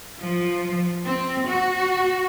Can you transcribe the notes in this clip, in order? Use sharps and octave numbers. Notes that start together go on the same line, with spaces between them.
F3
C4
F#4